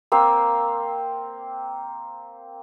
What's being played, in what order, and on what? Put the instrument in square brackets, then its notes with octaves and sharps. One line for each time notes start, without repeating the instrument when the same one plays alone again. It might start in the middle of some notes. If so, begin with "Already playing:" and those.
[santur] A#3 C4 F5 E6